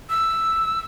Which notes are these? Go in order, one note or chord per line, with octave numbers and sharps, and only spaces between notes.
E6